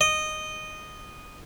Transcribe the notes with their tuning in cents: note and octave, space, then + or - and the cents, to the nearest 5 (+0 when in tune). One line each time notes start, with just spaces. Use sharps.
D#5 -10